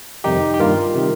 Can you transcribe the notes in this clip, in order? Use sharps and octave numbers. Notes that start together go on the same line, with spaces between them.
F2 C3 D#3 G3 D#4 G4
G4
G2 D#3 G3 A#3 F4 A#4
C3 D#3 G3